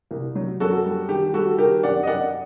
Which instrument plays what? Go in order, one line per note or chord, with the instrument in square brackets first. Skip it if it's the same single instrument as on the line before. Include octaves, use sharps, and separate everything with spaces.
[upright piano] C2
F#3
F#2 F#4 A4
G3
D#3 G4
G3 F#4 A4
D#3 G4 A#4
F#2 D5 F#5
D#5
F#2 D5 F#5